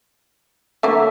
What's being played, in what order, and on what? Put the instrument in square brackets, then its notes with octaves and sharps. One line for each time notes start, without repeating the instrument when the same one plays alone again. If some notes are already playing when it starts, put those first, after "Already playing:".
[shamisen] D3 F#3 A#3 [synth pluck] E5